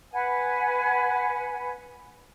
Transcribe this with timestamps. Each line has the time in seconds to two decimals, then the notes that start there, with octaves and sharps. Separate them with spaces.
0.12 B4 F#5 G#5